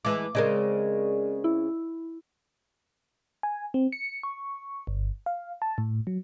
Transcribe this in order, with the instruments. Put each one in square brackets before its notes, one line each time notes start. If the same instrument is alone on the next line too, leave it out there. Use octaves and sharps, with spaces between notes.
[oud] E3 G#3 [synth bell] D6
[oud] C#3 G#3 C4 [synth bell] A#4 D5 D#5
[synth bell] E4
[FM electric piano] G#5
C4
C#7
C#6
G1
F5
A5
A2
F#3